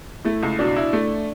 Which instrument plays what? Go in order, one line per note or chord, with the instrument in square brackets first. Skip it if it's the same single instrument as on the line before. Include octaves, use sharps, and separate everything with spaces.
[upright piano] A3 [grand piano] E4
[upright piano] C#2
[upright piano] B2 [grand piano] D4
[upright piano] E4
A3